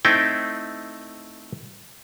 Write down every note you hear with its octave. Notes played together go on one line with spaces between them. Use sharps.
A3 C4 D#4 E4 G5